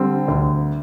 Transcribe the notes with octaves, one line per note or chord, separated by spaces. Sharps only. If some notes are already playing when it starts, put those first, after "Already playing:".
Already playing: D3 G3 C4
D2